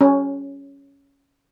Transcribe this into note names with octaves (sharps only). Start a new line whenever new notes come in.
C#4